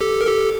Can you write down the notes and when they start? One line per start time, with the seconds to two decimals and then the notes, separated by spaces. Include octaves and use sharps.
0.01 G4 A4
0.21 A#4
0.27 G4 A4